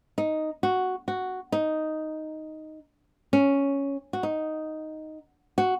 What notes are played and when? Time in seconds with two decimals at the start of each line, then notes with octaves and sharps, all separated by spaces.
0.18 D#4
0.63 F#4
1.08 F#4
1.52 D#4
3.33 C#4
4.13 F#4
4.23 D#4
5.58 F#4